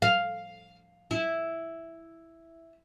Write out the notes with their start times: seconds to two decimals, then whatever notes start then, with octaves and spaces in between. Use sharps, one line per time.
0.02 F5
1.11 E4